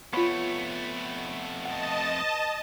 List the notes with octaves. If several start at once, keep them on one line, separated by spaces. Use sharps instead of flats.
F2 A3 B3 F4 C#5 B5
D#5 F#5 A5